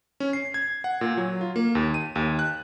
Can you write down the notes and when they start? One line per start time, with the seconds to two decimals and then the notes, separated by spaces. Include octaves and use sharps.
0.20 C#4
0.33 C7
0.54 G#6
0.84 F#5
1.01 A#2
1.17 F#3
1.41 F4
1.56 A#3
1.75 D#2
1.94 D#7
2.16 D#2
2.39 F#6